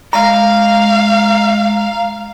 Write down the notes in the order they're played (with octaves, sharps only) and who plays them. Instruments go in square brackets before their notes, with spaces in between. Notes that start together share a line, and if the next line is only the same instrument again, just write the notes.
[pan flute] G#3 [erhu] F5 [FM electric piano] A#5